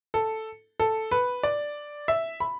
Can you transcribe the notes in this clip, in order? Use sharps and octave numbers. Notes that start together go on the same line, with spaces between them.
A4
A4
B4
D5
E5
B5